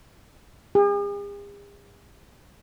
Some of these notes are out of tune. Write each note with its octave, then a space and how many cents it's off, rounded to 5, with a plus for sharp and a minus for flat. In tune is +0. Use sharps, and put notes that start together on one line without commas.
G#4 -45